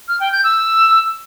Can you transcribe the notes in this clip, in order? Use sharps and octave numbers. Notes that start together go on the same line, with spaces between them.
F6
G5
G6
E6